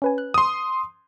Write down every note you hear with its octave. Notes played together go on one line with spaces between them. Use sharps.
C#4 B4 G#5
F#6
C6 D#6